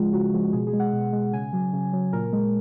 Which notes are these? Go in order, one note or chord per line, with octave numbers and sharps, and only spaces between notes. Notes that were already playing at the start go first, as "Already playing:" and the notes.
Already playing: C#3 F3 G#3 F4
C#3 F#4
F3 G#3
B2 G#4
G#4
G#3
F#5
B2
G#3
C#3 G#5
F#3
C#3
F#3
A#2 A#4
G#3